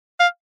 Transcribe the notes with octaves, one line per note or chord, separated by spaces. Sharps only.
F5